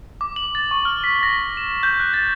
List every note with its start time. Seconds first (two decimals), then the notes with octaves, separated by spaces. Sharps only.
0.21 D6
0.36 F#7
0.55 A6
0.71 C#6
0.85 F6
1.04 B6
1.23 A#6
1.57 E7
1.83 G6
2.00 F#6
2.14 A6